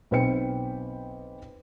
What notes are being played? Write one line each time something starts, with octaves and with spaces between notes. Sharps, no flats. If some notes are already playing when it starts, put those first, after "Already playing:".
B1 C4 B4 C5 G5 C#7